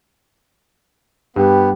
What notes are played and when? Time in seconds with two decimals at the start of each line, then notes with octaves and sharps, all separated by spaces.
1.36 G2 B3 G4